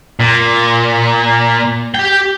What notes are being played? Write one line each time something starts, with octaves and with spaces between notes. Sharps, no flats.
A#2
G4 G5